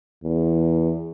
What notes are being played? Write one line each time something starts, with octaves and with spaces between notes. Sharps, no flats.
E2